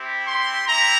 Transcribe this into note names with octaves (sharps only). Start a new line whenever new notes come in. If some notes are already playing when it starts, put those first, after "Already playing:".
Already playing: C4 E4 G4
C6
C4 E4 G4 A#5